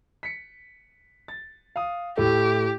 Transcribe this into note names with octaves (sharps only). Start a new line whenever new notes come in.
B6 C#7
A6
F5 D#6
A2 A3 G4